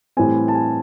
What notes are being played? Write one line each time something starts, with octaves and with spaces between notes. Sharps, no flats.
A2 E3 G3 C4 G#5
A5
G#5